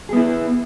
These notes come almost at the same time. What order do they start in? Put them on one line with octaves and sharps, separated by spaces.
G#4 B3 E4